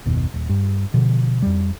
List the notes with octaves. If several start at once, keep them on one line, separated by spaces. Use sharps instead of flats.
F#1 D#2 B2
D#1
G2
B2 D3 F3
F2 G3